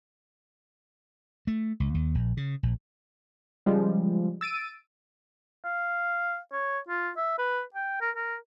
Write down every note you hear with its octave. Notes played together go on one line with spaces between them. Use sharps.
A3
C#2
D#2
A#1
C#3
A#1
C#3 F3 G3 G#3
E6 A6 D7 D#7
F5
C#5
F4
E5
B4
G5
A#4
A#4